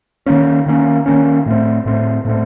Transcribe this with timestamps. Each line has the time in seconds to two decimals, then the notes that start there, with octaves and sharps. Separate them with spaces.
0.26 D#3 A#3 C#4
0.66 D#3 A#3 C#4
1.06 D#3 A#3 C#4
1.46 A2 A3 C4
1.86 A2 A3 C4
2.25 A2 A3 C4